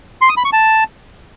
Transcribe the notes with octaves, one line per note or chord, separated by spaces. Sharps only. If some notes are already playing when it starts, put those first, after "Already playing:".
C6
D#6
B5
C#6
A5